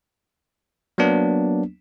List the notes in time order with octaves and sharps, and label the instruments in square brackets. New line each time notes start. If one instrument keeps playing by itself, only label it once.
[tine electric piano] F#3 A#3 B3 D4